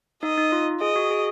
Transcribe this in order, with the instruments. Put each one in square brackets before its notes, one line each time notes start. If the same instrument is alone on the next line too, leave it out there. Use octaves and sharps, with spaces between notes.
[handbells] D#4 [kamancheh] D#5
[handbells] D#4
F4
[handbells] G#4 [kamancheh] D#5
[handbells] F#4
G#4